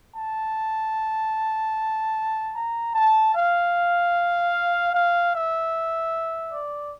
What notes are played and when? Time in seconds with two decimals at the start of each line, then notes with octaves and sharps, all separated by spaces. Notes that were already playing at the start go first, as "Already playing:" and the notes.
0.14 A5
2.53 A#5
2.93 A5
3.33 F5
4.93 F5
5.32 E5
6.52 D5